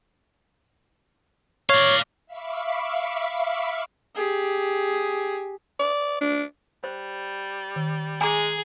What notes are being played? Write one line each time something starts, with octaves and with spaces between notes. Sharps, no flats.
C#5 D5 F5
E5 F5 B5 C#6 D6
G4 G#4
D5
D4
G3 C5
D#3
G#3 G#4 G#5 A#5 D6